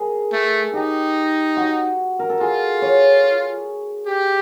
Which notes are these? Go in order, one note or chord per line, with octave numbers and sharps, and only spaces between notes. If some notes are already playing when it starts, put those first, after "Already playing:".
Already playing: G#4 A#4
A3
D#4 G4
F#4
A#4
A4
F4 G#4
C#5
G4